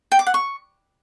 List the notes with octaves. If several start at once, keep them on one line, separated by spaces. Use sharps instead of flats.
G5
D6
F#5
C#6